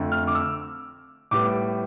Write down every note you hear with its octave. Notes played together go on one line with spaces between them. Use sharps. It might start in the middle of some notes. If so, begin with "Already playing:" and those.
Already playing: F2 D3 A3
F6
D6
E6
A2 G3 B3 D6